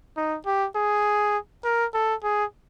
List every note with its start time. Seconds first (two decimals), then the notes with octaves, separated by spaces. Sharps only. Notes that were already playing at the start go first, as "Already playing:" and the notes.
0.17 D#4
0.46 G4
0.76 G#4
1.64 A#4
1.94 A4
2.24 G#4